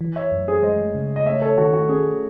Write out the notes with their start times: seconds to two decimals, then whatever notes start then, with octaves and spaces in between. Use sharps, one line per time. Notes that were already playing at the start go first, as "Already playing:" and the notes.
0.01 E3
0.16 C#5 E5
0.32 F#2
0.48 G#4 C5
0.63 G#3 C5 D#5
0.95 C#3
1.16 D#5
1.26 A3 C#5 E5
1.42 A4 C#5
1.58 D#3 F#4 A4
1.73 F#4
1.89 C#4 G#4